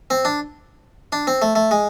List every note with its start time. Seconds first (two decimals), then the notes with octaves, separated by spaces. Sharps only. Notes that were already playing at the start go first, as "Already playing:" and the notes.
0.10 C4
0.25 D4
1.12 D4
1.27 C4
1.42 A3
1.55 A3
1.71 G#3